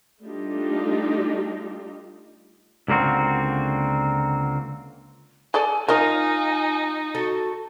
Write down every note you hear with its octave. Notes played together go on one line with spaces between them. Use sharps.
G3 A3 D4 D#4 F4 G4
C#2 D3 A#3 C4 F#4
G#4 A4 D5 G#5
D#4 F4 A#4 D#5 F5 G#5
F#4 A4